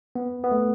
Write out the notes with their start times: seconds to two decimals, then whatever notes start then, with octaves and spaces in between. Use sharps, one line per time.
0.15 B3
0.44 B3
0.52 A3